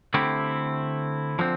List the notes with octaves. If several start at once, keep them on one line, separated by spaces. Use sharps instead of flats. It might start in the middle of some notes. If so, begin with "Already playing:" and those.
D3 A3 C4 E4 G4
D3 F3 C4